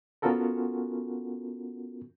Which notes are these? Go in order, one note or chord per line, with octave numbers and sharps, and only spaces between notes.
B3 C#4 F4 F#4 A4 A#4